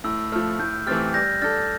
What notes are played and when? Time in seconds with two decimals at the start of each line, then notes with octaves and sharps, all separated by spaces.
0.04 A2 E6
0.32 F3 A3 F6
0.59 A2 G6
0.86 E3 A3 C4 G4 F6 A6
1.14 G3 G6 A#6
1.42 D4 A4 F6 A6